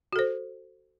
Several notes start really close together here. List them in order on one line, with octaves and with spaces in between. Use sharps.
F#4 A4 C5